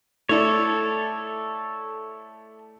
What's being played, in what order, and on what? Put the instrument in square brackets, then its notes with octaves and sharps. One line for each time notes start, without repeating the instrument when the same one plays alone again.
[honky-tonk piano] A3 E4 D5 [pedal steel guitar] A4 C#5